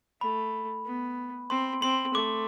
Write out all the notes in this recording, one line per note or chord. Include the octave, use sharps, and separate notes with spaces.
A3 B5
B3
C4 C6
C4 C6
A3 D6